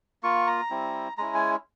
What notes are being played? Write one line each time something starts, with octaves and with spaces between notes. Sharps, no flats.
A#3 F4 C#6
A#5
G3 C4 E4
G#3 C#4 E4 A#5
G#5